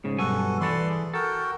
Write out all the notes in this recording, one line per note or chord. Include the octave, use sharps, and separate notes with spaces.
G#2 C#3
B1 G2 F#4 A4 G#5
E3 A4 B4 D5 C6
G#4
F#4 A4 A#4 G5